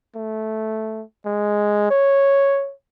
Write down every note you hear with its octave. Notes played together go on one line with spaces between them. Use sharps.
A3
G#3
C#5